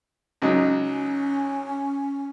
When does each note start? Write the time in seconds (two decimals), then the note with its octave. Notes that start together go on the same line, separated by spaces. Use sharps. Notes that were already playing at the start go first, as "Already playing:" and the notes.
0.42 C#2 F#3 D#4
0.83 C#4